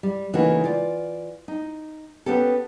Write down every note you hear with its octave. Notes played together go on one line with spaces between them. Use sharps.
G3
C#3 E3 A3 A#3 D#4 F#4
F4 D5
D#4
B3 C#4 G4 A4